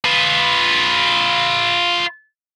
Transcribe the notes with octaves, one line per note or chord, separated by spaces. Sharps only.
F4 B4